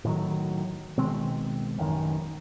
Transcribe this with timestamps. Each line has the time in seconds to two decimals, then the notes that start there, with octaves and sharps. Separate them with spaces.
0.05 A2 D#3 F#3
0.97 B2 D#3 G#3 C4
1.78 A1 F#2 D#3